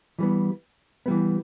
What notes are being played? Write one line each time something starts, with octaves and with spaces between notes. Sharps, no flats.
E3 G3 B3
E3 G3 B3